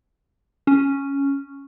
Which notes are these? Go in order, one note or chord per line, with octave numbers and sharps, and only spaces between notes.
C#4